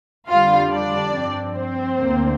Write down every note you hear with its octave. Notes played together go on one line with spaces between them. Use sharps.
F2 D3 G3 F4 F5
D4 D5
G2 F3 C4
C4 C5
D2 D3 A#3